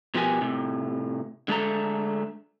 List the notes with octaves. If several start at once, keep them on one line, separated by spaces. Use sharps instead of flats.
B2 F3 B3 G4 A#4 G#5
A2 C3
D3 G#3 A3 A4 A#5